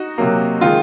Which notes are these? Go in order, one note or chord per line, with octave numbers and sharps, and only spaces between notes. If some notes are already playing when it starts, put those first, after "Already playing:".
Already playing: D#4 F#4
C3 F#3 A#3
D#3 G#3 F4